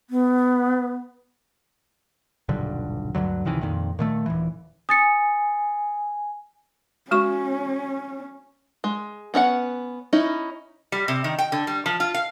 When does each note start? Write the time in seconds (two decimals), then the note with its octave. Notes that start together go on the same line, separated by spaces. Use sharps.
0.10 B3
2.49 D#1 B1 G2 D3
3.15 D2 G2 D3 F#3
3.45 C#2 C3 D#3 E3
3.61 F2 A#2 D#3
3.99 A#2 D#3 A3
4.26 D#1 D#2 E3
4.89 G#5 D#6 A6 C#7
7.11 G#3 C#4 F#4 C#6
8.84 G#3
9.34 B3 C#4 D#5 F#5
10.13 C#4 D#4 E4
10.92 G3
11.08 C3
11.24 D#3
11.39 G5
11.52 D3
11.67 G3
11.86 F3
12.00 F4
12.14 F5